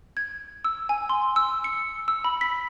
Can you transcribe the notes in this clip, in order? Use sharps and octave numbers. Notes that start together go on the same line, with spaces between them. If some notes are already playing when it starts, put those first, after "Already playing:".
G#6
E6
G#5
C6
E6
C#7
E6
B5
B6